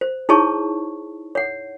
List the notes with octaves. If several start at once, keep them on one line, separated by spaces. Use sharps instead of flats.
C5
D#4 E4 G#4 C#5 A5 C#6
C#5 F#5